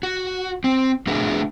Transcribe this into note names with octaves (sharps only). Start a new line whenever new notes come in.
F#4
C4
A3 D4 F#4 G#4 B4